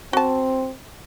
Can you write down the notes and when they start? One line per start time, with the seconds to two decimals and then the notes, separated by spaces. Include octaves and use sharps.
0.13 C4 F#4 A5